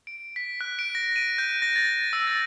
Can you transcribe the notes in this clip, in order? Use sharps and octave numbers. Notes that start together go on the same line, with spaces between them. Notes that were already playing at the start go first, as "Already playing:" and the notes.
D7
B6
F#6
D7
A#6
D#7
G6
A#6
A6
E6
A6